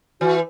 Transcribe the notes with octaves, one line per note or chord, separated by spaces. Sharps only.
E3 F#4